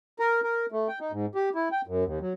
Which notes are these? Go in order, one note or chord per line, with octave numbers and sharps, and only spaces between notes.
A#4
A#4
A3
G5
D#4
G#2
G4
E4
G5
F#2
D#2
F#3